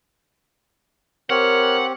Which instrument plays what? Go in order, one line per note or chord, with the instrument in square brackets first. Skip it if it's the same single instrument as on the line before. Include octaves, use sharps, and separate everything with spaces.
[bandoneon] C4 G4 [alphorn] A#4 [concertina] C#5 F6 [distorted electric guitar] F#5